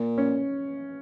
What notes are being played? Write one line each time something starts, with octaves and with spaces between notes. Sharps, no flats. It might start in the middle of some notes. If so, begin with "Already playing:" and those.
Already playing: A#2
C#4